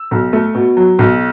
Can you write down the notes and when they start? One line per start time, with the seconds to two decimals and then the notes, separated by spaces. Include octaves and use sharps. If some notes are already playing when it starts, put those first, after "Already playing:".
Already playing: E6
0.11 B1
0.33 A3
0.55 B2
0.77 F#3
0.99 B1